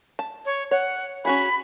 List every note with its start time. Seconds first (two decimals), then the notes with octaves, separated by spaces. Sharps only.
0.19 A5
0.46 C#5
0.71 C#5 F#5
1.25 C#4 F#4 G#4 B5